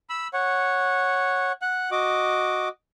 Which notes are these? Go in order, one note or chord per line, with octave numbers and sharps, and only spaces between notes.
B5 E6
C#5 F#5
F#5 F#6
F#4 D#5 D6